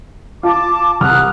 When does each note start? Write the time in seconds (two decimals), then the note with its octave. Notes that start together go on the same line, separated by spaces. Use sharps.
0.43 F4 A5 D6
1.00 C2 D#6 F6 F#6